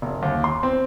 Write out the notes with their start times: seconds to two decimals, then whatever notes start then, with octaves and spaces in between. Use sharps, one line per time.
0.02 F#1
0.23 D#2
0.44 C6
0.63 C4